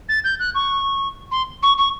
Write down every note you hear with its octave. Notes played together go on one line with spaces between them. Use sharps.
A6
G6
F#6
C#6
C6
C#6
C#6